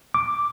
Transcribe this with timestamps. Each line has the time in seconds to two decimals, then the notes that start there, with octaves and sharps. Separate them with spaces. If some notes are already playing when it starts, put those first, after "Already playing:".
0.14 D6